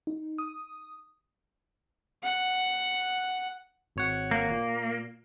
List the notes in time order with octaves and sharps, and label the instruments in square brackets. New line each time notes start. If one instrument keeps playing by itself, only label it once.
[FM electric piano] D#4
D#6
[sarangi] F#5
[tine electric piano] G#1 C#5 F#5
[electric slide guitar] A#3
[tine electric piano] A#2